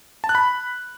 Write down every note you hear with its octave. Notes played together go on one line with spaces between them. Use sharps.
A5
F#6
B5